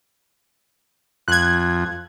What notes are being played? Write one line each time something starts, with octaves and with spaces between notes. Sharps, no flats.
F2 F#6 G#6